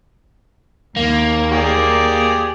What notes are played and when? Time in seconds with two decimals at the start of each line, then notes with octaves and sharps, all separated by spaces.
0.96 D#2 A#3
1.52 G4 G#4 D5